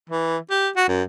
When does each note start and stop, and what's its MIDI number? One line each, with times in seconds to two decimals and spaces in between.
0.10 0.38 52
0.51 0.69 67
0.77 0.84 66
0.88 1.03 42